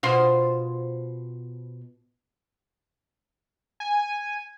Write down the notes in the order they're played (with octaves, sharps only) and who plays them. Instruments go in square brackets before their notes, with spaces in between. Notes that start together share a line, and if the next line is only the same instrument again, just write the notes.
[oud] B2 F4 C5
[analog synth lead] G#5